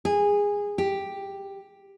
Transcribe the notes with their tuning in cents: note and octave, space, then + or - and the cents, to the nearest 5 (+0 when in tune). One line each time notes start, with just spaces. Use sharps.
G#4 -20
G4 +5